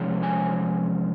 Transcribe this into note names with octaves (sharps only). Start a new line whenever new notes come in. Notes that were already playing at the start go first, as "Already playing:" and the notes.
Already playing: C3 F3 G#3 C#4
G#5